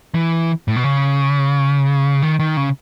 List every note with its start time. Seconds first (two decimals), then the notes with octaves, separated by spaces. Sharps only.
0.15 E3
0.68 A2
0.76 B2
0.84 C#3
2.22 D#3
2.39 D#3
2.57 C#3